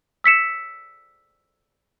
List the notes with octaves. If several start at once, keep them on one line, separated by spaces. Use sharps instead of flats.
E6 B6 C#7 E7